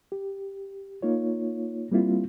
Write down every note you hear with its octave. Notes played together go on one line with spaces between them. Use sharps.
G4
A#3 D#4 F4 C#5
G3 A#3 C4 E4 F4